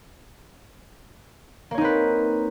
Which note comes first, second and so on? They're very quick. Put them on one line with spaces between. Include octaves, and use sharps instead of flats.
A#3 C#5 D#4 C4 B4